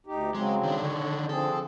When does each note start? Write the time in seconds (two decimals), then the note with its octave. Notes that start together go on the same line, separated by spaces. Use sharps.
0.07 D2 D#4 G4
0.35 C#3 F#3 G#3 C4
0.63 D#3 D4
0.83 D3 C#5
1.29 F3 C4 G#4 A4